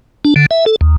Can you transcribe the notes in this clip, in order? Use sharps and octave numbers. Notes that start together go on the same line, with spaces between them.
D4
D3
E5
A4
D#2